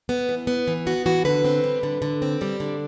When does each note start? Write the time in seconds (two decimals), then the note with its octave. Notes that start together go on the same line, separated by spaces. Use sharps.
0.09 B3
0.29 E3
0.47 B3
0.67 E3
0.87 B3 F#4
1.06 E3 F#4
1.25 D3 B4
1.45 C4
1.64 G3
1.83 D3
2.02 D3
2.22 C4
2.41 G3 D5
2.60 D3